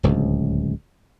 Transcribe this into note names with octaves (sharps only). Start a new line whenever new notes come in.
D1 C#2